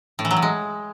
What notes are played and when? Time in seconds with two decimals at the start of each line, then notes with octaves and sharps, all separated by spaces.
0.19 A2
0.25 E3
0.31 F#3
0.37 A2
0.42 G#3